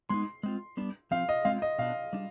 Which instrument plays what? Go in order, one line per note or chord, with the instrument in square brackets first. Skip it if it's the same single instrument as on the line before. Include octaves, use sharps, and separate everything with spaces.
[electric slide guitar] G#3 B3 D#4 [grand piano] C6
[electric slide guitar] G#3 C4 F4
G3 B3 D4
[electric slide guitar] F3 C4 F4 [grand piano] F5
[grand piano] D#5
[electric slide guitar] G#3 C4 F4 [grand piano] F5
[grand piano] D#5
[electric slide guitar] B2 B3 D4 [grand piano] F5
[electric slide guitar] G3 D4